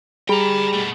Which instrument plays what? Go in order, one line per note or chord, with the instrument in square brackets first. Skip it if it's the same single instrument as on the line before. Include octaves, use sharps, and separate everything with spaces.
[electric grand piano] G3 [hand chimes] G#4 B5 [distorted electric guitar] G5 A#5
[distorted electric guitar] B2 A3